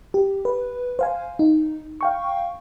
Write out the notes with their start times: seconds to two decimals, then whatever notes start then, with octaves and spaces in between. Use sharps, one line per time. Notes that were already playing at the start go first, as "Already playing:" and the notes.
0.14 G4
0.45 B4
0.99 C5 F5 G#5
1.39 D#4
2.01 F5 G5 C#6